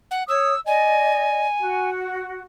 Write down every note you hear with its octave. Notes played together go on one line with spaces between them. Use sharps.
F#5
C#5 D#6 E6
D5 D#5 G#5
F#4